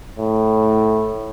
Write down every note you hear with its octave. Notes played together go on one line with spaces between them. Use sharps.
A2